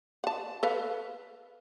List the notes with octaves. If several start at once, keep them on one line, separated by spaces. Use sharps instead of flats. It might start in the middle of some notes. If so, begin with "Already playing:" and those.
F#5 A5
A4 B4 F5